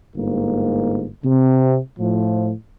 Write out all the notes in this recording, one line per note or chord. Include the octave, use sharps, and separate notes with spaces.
G1 G#2 A#3
C3
A2 F3